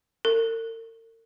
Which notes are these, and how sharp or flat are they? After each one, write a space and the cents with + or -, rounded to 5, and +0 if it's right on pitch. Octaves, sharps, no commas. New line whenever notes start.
A#4 -45